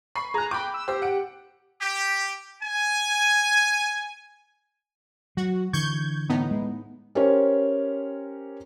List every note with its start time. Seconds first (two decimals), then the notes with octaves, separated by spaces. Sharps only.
0.16 B5 C#6 C7
0.34 G#4 A#5 F#6
0.51 G5 B5 D6
0.74 E6
0.88 G4 C5 E6
1.02 F#5 D7
1.81 G4
2.63 G#5
5.37 F#3 F#4
5.73 D3 E3 C#6 G6 G#6
6.29 A2 B3 D#4
6.51 G#3
7.15 C#4 G4 A#4 C5 C#5